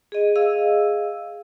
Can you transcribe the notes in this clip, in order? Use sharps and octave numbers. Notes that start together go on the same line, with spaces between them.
G#4 D#5
G#4 D#5 F5 E6